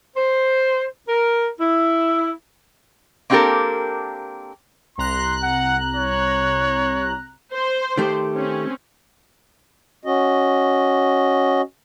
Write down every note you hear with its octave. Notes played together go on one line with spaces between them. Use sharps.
C5
A#4
E4
A#3 C4 D4 G4 A4 A#4
C2 A#5 C6 F#6
F#5
C#5
C5
D#3 A3 G4
C4 C#4
C#4 F#4 D#5